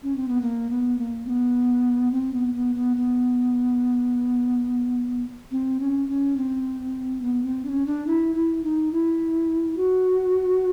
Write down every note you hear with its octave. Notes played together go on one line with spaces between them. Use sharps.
C#4
C4
B3
A#3
B3
A#3
C4
B3
C4
B3
B3
B3
B3
C4
C#4
C#4
C4
B3
C4
D4
C#4
D4
E4
E4
D#4
E4
F#4